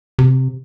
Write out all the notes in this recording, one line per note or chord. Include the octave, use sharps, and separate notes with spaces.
C3